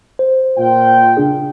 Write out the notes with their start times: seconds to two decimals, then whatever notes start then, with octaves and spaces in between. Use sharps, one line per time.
0.19 C5
0.57 A#2 F4 G5
1.17 C#3 D4 G#4